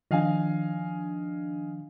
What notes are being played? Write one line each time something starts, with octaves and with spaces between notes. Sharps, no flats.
D#3 F3 D4 D#5 F5 G#5